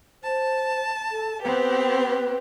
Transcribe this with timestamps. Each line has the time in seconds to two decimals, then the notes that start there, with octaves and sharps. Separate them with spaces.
0.23 C5 A5
1.11 A4
1.41 B3 C4 G4 B4
2.09 B4